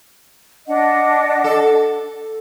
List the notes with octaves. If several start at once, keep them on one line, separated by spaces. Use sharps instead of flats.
D4 D#5 F#5
A4